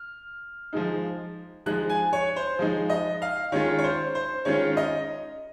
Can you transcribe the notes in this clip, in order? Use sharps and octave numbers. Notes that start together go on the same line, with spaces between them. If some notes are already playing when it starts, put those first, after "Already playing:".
Already playing: F6
F3 G#3 D#4
F3 G#3 D#4 F#6
G#5
C#5
C5
F3 G#3 D#4
D#5
F5
D#3 G#3 C#4 F4 C#5
C#5
C5
C5
D#3 G#3 C#4 F4 C#5
D#5